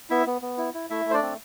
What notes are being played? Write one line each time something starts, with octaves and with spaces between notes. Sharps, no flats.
B3 E4 E5
B3
B3
E4
E4
A3 E4 E5
A3
C5
D4 D5
C4